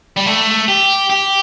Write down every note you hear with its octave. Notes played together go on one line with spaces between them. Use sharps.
G3
A3
G4
G4